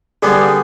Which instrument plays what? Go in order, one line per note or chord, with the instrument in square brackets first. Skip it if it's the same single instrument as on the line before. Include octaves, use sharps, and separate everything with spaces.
[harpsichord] D3 G3 B3 [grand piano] G#4